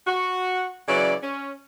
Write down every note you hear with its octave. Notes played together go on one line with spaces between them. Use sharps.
F#4
C#3 E3 F#3 D5
C#4